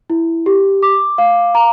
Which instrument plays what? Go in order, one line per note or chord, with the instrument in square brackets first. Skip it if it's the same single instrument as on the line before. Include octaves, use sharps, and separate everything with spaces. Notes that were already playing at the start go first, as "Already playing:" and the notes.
[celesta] E4
G4
D6
F5
A#5